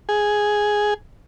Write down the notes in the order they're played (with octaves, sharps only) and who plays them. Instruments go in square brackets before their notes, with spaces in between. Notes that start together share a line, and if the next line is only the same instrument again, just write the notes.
[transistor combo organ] G#4